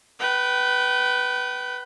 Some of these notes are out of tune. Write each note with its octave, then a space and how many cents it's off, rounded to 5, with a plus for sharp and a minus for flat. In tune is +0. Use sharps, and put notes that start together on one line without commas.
B4 +0 G5 -40